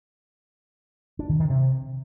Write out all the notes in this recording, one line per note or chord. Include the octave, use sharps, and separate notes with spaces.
D4
D#3
D#3
C3